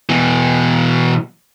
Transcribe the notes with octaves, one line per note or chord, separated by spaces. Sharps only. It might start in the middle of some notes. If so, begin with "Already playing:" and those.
B2 E3